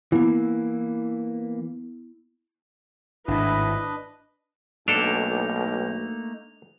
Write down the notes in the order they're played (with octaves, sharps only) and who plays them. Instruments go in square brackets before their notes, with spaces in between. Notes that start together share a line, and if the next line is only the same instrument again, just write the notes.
[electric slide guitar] E3 A#3 [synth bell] B3 E4
[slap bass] G#1 A2 [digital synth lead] D4 [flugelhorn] E4 [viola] B4 D#5
[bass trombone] B1 [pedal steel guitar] A3 A#3 D#4 [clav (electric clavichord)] D4 A4 [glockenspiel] F7